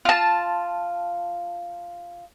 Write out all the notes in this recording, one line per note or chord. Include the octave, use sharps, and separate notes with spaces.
F4 A5